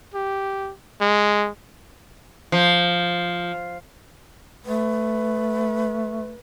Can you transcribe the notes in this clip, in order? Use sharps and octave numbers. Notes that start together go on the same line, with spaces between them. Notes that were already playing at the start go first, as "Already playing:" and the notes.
G4
G#3
F3
A3 B4